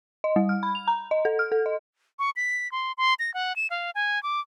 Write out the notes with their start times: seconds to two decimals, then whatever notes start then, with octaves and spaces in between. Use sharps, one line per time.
0.24 D#5
0.36 G3
0.49 F6
0.63 B5
0.75 F7
0.87 A#5
1.11 D#5
1.25 A4
1.39 F6
1.52 A4
1.66 D#5
2.19 C#6
2.36 B6
2.72 C6
2.98 C6
3.19 A#6
3.34 F#5
3.56 E7
3.70 F5
3.95 G#5
4.23 D6